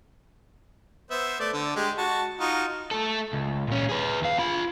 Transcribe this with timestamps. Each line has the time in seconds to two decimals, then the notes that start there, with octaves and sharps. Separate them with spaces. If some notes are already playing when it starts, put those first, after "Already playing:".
1.11 B3 C5 E5
1.40 A3 D5
1.54 D3
1.76 G#3 G4
1.98 F#4 A5
2.40 D#4 F4 F#4
2.91 A3 A4
3.33 C#2
3.68 A#2 C#4
3.89 G#4 B4
4.21 D#2 F5
4.39 F4 B5